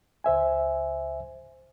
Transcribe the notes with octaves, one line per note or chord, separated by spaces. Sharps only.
C#2 C5 E5 G#5